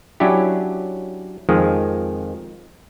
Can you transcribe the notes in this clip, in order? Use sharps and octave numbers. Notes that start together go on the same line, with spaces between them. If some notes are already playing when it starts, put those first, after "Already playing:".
F#3 C#4 D4 E4 G4
F2 D#3 F3 G#3